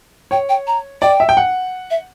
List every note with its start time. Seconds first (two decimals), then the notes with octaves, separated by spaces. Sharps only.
0.31 C#5 G5
0.49 G5
0.67 A#5
1.02 D5 G5
1.20 E5
1.29 G5
1.37 F#5
1.90 E5